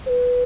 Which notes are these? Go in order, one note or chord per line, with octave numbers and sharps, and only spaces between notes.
C5
B4